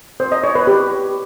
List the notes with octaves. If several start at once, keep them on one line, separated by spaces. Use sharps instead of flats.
C5
D#5
C#5
B4
G4